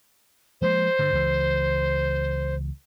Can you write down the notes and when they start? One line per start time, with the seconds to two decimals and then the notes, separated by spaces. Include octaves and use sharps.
0.62 F3 G#3 A#3 C5
0.99 G2 D3
1.12 C#2 E3